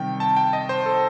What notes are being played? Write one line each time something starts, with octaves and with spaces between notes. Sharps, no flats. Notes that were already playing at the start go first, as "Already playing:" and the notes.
Already playing: C3 D#3 G3 G5
A5
G5
D#5
C5
A4